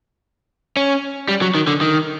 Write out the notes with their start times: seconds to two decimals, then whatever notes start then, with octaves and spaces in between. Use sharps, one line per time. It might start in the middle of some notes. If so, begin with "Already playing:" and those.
0.77 C#4
1.28 G3
1.42 F#3
1.55 D#3
1.67 D3
1.81 D#3